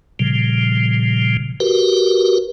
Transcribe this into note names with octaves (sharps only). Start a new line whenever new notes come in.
A#2 C#3 F3 G3
F#4 G4 A#4 B4